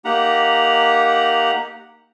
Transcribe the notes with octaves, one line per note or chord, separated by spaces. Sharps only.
A#3 D#4 G4 F#5 A#5